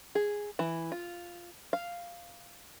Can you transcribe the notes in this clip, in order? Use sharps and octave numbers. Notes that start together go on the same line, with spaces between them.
G#4
E3
F4
F5